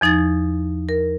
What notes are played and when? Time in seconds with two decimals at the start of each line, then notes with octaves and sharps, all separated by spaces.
0.01 E2 F3 D#4 G#6 A6
0.89 A#4